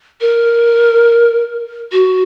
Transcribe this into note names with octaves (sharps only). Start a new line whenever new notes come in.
A#4
F#4